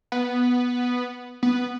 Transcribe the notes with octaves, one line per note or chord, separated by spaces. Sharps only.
B3
B3